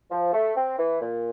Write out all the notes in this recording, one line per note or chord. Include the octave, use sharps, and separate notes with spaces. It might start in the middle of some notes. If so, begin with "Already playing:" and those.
F3
A3
C4
E3
A#2